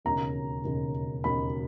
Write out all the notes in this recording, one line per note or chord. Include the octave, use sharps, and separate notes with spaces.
E1 D#2 C#3 A#5
E1 D#2 C#3
E1 D#2 C#3 B5